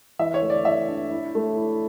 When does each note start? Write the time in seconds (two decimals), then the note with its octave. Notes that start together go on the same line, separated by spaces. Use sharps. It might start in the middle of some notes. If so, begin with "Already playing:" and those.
0.19 E3 E5
0.34 C#5
0.42 A3
0.50 D5
0.65 E3 E5
0.88 D4
1.11 E4
1.35 A3
1.57 E4